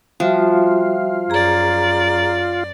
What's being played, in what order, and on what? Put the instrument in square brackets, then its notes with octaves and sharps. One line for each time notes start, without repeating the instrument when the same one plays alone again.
[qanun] F3 [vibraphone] G3 F#4 E5 [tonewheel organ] F4
[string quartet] F#2 D5 [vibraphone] G#4 A#5